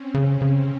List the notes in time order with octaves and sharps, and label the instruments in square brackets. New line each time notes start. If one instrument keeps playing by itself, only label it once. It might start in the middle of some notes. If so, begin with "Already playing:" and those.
Already playing: [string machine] C4 C#4
[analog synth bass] C#3
C#3